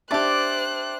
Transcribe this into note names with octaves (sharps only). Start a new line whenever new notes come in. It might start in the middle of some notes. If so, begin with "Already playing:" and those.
D4 G4 C5 D5 E5 A5 F#6